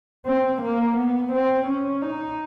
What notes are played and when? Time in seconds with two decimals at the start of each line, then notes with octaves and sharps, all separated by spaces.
0.26 C4
0.62 A#3
0.97 B3
1.32 C4
1.67 C#4
2.02 D#4